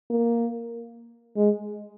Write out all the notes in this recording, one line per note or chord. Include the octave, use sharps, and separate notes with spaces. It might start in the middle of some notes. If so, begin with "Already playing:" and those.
A#3
G#3